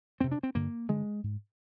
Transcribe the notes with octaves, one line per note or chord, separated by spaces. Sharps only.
F2 C3 C4
D4
C4
G2 D3 A#3
G2 D3 G#3
G#2